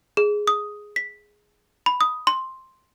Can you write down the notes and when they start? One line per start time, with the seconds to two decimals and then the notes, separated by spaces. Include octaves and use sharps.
0.17 G#4
0.47 D#6
0.96 B6
1.86 B5
2.01 D#6
2.27 C6